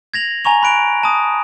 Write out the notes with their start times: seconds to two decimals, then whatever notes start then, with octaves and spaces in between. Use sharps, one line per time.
0.14 G#6 A#6 F7 F#7
0.45 G#5 A#5 C#6 F7
0.63 B5 F#6 D7 F7
1.03 A5 D#6